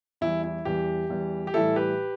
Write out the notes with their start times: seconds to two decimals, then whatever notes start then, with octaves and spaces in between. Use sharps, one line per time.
0.21 E2 E3 G3 E4
0.44 E4
0.65 E2 E3 G3 G4
1.09 E2 E3 G3
1.47 G4
1.54 A2 E3 G3 E4 A4
1.76 G4 B4